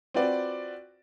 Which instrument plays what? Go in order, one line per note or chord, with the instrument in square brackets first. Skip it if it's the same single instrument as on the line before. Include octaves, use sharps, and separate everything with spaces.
[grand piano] C4 F4 F#4 B4 D5